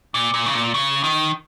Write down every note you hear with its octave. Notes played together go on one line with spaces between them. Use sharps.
A#2
A#2
C#3
A#2
C#3
D#3